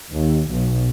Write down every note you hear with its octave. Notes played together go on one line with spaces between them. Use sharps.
D#2
B1